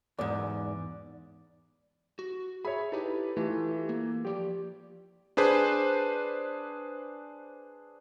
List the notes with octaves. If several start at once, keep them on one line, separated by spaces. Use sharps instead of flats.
E2 G#2 D5
F#4
G#4 C#5 E5 B5
D#4 E4 G4 A4 B4
E3 A3 F4 G4
A#3
F3 G4 D5
D4 G#4 B4 C5